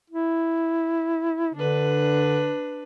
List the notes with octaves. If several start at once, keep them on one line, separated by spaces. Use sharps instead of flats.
E4
D3 D4 B4